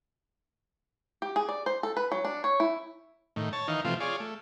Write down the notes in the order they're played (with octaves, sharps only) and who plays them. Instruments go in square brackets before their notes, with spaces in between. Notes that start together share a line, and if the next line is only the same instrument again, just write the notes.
[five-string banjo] G4
G#4
D5
C5
A4
B4
F#3
D4
C#5
E4
[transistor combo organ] A2 D#3
C#5 A5
D#3 E3 D#4 F5
C3 E3 F3 A3 F4
F4 G#4 C#5 D5
A3